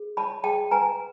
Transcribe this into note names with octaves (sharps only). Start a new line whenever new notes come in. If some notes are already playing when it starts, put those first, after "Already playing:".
Already playing: G#4
C#5 A5 B5
G#4 G5 A5
B4 G#5 A#5